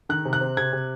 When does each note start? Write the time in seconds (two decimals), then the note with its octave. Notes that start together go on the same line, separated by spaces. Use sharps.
0.09 D#3 F#6
0.25 C3
0.33 F#6
0.41 C4
0.57 C3 G#6
0.73 C3